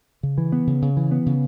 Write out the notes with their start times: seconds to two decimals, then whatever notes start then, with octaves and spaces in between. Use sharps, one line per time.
0.23 C#3
0.38 E3
0.52 B3
0.67 C#3
0.82 C#3
0.97 E3
1.11 B3
1.26 C#3